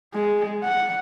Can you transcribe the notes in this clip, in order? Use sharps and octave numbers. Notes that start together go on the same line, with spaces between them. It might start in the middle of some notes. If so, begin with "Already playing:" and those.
G#3
F#5